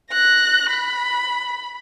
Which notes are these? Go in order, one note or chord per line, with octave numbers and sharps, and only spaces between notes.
F#6 A#6
B5